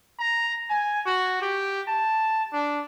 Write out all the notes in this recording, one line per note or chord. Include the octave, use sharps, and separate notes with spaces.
A#5
G#5
F#4
G4
A5
D4